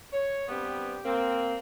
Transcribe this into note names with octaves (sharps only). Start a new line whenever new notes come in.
C#5
G2 B3 C4 G4
A#3 C4